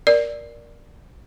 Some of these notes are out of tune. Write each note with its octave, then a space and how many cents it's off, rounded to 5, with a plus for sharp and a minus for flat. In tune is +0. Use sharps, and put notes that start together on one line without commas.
A#4 +10 D5 +0